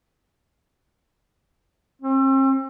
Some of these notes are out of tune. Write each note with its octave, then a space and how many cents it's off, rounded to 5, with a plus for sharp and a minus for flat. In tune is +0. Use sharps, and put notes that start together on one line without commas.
C4 +45